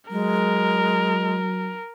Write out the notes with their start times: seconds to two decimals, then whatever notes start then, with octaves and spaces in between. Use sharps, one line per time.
0.11 F#3 G#3 A#4